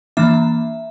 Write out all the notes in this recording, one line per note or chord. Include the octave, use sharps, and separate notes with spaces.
E3 A#3 D4 E5